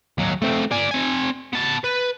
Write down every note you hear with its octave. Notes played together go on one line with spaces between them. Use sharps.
D#2 F#3
A3 C4
D5 G#5
C4 G#5
B3 A5
B4